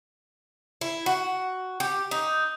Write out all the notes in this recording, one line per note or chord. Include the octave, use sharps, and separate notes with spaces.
E4
F#4
G4
D#4